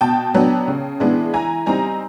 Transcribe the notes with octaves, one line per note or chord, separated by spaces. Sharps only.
B2 G5 A5
F#3 B3 D4
C#3
E3 G#3 B3 D4
E3 G#5 A#5
G3 C4 D#4 G#5 A#5